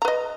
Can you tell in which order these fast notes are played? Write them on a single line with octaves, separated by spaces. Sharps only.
A#5 B4 D#5